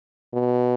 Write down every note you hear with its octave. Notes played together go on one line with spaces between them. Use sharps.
B2